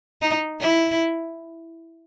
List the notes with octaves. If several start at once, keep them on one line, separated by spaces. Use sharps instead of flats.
D#4
E4